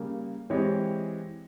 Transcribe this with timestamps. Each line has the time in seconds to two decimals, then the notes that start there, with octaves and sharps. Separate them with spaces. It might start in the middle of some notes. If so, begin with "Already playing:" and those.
Already playing: C#3 G3 A#3
0.50 E3 G#3 C4 G4 C#5